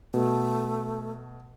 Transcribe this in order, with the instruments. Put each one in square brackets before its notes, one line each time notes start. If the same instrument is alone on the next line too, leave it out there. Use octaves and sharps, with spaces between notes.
[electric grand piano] B2 [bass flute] A3